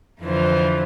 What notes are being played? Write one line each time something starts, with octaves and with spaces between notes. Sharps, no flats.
F2 D3 E3 F4 C5